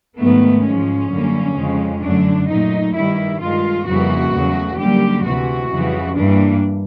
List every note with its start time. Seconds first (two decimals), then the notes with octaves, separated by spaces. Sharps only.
0.18 G#2 D#3 F#3 A3 B3
0.65 G#2 F3 G#3 C#4
1.11 F#2 D3 G3 A#3
1.56 F2 C#3 F3 G#3
2.02 F#2 D3 F#3 A3 D4
2.48 A#2 F#3 A3 D#4
2.94 G2 D#3 G3 E4
3.40 G2 D#3 G#3 F4
3.86 F2 C#3 E3 G3 A#3 F#4
4.32 E2 C#3 F#3 A3
4.78 F#2 D3 G3 A#3 G4
5.24 D2 C3 E3 F#4
5.70 F2 C#3 E3 G3
6.16 G2 E3 G3 A#3 D4